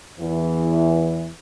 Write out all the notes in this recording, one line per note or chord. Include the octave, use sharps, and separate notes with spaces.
E2 E3